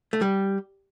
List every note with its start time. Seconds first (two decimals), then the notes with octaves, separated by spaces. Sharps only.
0.13 A3
0.22 G3